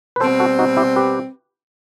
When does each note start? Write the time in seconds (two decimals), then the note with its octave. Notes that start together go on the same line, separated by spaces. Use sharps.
0.16 B4
0.20 B2 G3 C4 A4 C5
0.40 F#4 A4
0.59 D#4 F#4
0.77 E4 G4
0.96 G4 B4